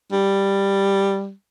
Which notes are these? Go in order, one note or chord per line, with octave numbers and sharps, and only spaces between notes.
G3